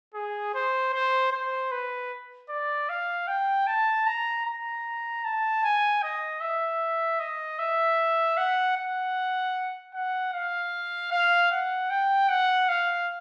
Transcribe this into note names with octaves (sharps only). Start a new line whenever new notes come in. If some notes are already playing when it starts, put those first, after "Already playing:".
G#4
C5
C5
C5
B4
D5
F5
G5
A5
A#5
A#5
A5
G#5
D#5
E5
D#5
E5
F#5
F#5
F#5
F5
F5
F#5
G5
F#5
F5